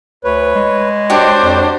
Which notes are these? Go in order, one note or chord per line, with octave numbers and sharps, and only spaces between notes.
D2 B4 C#5
G#3
D4 F#4 G4 C5 C#5
F2